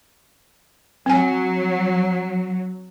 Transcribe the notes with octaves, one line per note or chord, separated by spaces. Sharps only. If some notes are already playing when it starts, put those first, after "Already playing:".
F#3 C4 G#5